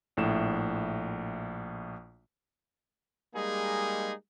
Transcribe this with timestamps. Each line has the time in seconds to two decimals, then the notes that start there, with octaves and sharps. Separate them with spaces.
0.17 A#1 A2 E7
3.34 G3 G#3 A#3 D#4 G#4